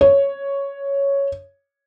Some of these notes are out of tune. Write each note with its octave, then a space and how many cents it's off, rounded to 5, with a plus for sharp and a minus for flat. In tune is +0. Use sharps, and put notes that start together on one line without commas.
C#5 +0